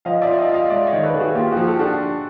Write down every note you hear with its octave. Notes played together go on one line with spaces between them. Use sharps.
F3 D#5 F5
D5 E5
F4
D#5 F5
F4 D#5 F5
G#3 D5 E5
C#5 D#5
D#3
A4 B4
D#3
F#4 G#4
A#3 F4 G4
F#4 G#4
F3
G4 A4
D4 F#4